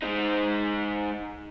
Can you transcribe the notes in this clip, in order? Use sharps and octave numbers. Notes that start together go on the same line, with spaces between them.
G#3 D#4